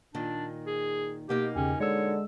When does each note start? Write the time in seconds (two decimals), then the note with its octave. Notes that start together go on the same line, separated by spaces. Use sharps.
0.15 A#2 D#3 D4
0.66 G#4
1.29 B2 A#3 D#4 G4
1.56 E2 C#3 C#4 G4
1.80 D3 G#3 C#5 E6